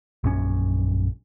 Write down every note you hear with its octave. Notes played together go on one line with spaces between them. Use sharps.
A#1 F#2 C#4